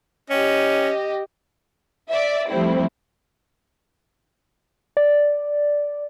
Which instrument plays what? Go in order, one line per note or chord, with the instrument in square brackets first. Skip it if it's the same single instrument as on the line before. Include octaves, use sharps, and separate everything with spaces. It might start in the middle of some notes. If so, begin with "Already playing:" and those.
[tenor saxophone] C#4 [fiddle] G4 D#5
[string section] D5 E5
F3 G3 A3 C4 E4
[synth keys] D5